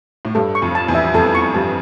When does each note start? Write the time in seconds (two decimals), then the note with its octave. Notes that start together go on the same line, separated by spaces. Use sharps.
0.25 A2
0.35 G2 A4
0.55 C#6
0.62 F2
0.75 A5
0.88 E2
0.95 E5
1.14 F2 A4
1.35 C#6
1.55 G2 A5